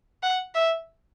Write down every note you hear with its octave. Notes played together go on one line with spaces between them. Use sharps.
F#5
E5